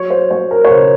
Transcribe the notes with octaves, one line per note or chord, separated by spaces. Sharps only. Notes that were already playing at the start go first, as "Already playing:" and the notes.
Already playing: F#3 C#5
C5
F#3 C#5
A#4
C#5
C#3 C5